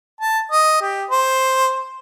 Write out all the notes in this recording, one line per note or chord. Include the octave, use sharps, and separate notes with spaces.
A5
D#5
G4
C5